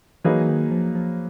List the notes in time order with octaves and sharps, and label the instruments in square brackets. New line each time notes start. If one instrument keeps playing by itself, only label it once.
[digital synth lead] E3 [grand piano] F#3 A#3 D#4 G#4 B4
[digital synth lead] E3
D#3
F3
F3